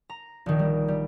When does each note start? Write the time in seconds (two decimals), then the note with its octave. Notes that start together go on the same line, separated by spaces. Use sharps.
0.10 A#5
0.46 A#1 D#3
0.59 G3
0.88 G3